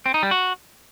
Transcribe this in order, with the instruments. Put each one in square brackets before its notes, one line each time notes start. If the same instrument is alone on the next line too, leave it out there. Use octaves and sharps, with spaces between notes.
[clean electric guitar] C4
D#4
G3
F#4